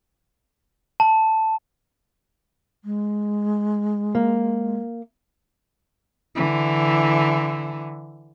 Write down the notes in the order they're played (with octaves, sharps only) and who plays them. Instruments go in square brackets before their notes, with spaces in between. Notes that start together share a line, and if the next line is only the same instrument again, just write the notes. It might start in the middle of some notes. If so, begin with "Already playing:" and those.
[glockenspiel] A5
[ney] G#3
[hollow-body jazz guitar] A#3
[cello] D3 E3